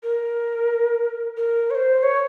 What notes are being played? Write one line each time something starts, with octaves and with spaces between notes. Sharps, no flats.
A#4
A#4
C#5
C5
C#5